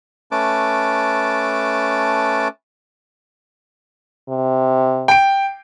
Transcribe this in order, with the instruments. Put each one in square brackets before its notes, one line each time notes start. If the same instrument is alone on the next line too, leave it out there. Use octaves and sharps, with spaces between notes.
[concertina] A3 C#4 B4 A5 D6
[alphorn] C3
[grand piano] G5 D7